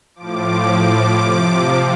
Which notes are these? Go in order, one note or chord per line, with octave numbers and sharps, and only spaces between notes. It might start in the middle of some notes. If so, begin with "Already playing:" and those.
A2 F3 D6
C3 F3